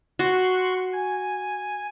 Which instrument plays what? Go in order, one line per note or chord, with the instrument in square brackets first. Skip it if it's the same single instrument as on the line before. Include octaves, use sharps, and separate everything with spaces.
[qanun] F#4 [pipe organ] C6 C#6 F#6
[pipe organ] G#5